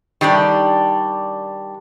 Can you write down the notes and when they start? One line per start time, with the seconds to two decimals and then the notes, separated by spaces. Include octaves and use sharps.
0.21 D#3 G3 D4 D5